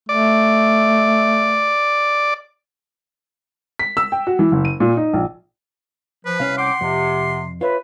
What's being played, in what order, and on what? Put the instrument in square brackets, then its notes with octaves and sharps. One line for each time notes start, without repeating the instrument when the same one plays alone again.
[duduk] A3 [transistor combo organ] D5
[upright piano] B6
E6
G5
F#4
E3
F#1
D#7
A#2
D#4
A#1
[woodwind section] F3 [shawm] B4
[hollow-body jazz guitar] C2 C#4 [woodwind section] F5
[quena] F#5 [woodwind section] G5 D6 [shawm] C6
[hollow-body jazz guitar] F2 [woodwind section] C3
[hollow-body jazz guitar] F4 C#5 E5 [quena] B4